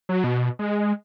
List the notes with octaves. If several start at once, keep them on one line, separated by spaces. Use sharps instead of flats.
F#3
B2
G#3